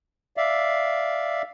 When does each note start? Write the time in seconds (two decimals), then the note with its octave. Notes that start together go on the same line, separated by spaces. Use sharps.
0.37 D5 E5 F5